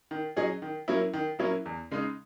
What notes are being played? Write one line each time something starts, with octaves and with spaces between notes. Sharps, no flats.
D#3
F#3 C#4 G#4 D#5
D#3
F#3 A#3 C#4 E4
D#3
F#3 A#3 C#4 E4
E2
C#3 G#3 D#4